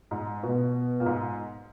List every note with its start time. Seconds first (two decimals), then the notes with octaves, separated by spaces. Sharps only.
0.11 G#2
0.43 B2
1.00 A#2
1.06 G#2